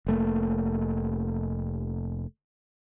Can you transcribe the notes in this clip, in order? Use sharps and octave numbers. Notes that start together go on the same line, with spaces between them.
F1 A3 A#3